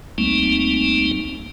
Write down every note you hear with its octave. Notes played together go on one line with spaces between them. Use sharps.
C#2 G3 A3 A#3 C4 D#4